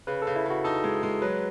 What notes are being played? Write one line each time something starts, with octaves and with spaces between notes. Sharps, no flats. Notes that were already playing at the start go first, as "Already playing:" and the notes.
C#3 B4
A4
C#3
E4
C#3 F#4
D#4 A4
G#3
G#3
F#3 B4